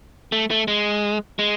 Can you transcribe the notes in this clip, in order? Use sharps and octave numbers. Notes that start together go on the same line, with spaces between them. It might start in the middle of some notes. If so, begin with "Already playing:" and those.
A3
A3
G#3
G#3